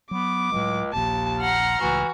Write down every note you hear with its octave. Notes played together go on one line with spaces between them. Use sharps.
F#3 B3 D6
C#2 A2 F#3 G#3
D#1 A#1 D#2 A5
F#5 A#5 C6 F6
C#2 A2 E3 F#4